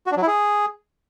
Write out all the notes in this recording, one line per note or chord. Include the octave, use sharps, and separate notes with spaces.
F#4
D4
F#3
E4
G#4